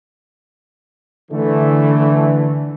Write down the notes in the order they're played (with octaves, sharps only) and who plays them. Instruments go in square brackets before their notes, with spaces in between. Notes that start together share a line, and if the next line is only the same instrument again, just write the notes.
[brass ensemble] D3 E3 A3